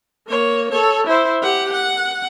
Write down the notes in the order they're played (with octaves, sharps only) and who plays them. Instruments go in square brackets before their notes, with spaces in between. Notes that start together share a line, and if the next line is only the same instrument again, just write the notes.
[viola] A#3 C#5
A4 C#5
E4 C5
G4 F#5
F#5